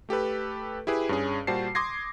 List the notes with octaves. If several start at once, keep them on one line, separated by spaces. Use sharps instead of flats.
A3 G4 A4 B4
E4 G4 G#4 B4
G2 C#4 G#4
A#2 G3 F#4 C5 A5 C7
C6 D6 D#6 G#6 A#6 C7